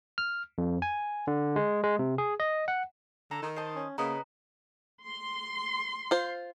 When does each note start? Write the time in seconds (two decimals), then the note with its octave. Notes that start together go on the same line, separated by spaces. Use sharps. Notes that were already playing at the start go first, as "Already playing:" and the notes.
0.18 F6
0.58 F2
0.82 G#5
1.27 D3
1.56 G#3
1.83 G#3
1.99 C3
2.18 G#4
2.40 D#5
2.68 F#5
3.31 D3 A4 A#5
3.42 D#3 D#4
3.56 C5 D#5 A5
3.76 C#4
3.98 C#3 A#3 B3 B4 D#5 A#5
5.04 C6
6.11 F4 C5